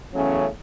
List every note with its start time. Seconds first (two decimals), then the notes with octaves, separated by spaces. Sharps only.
0.14 E2 C#3 F#3 A3 C#4